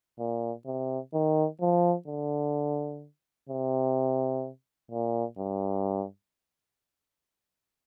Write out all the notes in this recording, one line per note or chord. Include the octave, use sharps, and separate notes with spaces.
A#2
C3
D#3
F3
D3
C3
A#2
G2